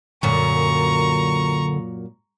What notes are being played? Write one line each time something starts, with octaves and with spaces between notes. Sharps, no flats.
F#2 A#2 D3 A#5 C#6